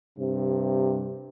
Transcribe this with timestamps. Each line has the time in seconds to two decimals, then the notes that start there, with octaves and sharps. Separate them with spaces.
0.18 G2 C3